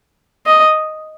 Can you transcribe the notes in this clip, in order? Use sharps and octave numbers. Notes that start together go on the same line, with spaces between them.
D#5